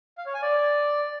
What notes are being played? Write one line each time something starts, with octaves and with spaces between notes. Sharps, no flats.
F5
C#5
G#5
D5